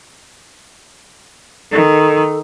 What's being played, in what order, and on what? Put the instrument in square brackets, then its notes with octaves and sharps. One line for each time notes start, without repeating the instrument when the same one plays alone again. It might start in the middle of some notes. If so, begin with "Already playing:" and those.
[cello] D#3 [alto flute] A4